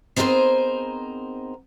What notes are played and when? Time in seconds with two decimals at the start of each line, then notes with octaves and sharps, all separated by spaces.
0.16 B3 C4 D#4 G#4 A#4 C5